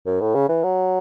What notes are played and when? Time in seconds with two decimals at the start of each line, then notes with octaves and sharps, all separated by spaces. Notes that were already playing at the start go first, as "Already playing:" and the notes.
0.06 F#2
0.21 A2
0.35 C#3
0.49 E3
0.63 F#3